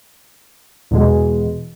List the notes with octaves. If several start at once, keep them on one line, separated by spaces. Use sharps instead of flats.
E2 B2 G#3